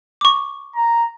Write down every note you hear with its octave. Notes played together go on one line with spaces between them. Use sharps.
C#6 D6
A#5